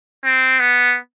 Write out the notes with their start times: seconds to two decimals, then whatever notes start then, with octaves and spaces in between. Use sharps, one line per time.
0.25 C4
0.60 B3